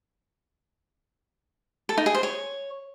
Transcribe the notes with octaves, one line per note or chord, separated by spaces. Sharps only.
A4
D#4
G#4
C5
C#5